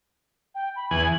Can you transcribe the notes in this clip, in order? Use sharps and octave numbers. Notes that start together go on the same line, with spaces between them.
G5
B5
E2 G#5 F#7